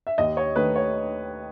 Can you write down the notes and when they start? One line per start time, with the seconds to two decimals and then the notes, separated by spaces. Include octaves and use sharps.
0.07 E5
0.18 D#2 D#5
0.37 C#5
0.56 D#3 A3 B4
0.76 C#5